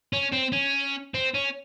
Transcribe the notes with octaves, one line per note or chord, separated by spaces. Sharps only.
C#4
C4
C#4
C4
C#4